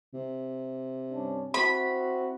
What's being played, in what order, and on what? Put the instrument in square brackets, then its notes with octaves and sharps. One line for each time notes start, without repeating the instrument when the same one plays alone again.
[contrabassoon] C3
[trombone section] G2 C#4 D4
[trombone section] C4 E4 F#4 [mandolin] B5